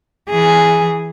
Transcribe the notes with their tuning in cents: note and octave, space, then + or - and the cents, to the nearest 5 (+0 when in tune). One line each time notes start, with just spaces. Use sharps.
E3 -5 G#4 +0